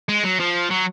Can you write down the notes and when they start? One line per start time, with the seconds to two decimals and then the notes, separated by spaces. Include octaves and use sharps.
0.09 G#3
0.24 F#3
0.40 F3
0.71 F#3